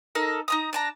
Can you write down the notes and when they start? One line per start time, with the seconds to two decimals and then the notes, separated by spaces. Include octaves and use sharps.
0.15 D#4 A4 A#4
0.48 D#4 A#5 D#6
0.73 D4 A5 A#5